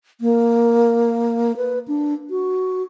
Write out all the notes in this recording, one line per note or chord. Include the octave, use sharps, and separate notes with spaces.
A#3
B4
D4
F#4